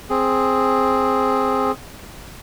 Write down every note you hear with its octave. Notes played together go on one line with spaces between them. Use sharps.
C4 G#4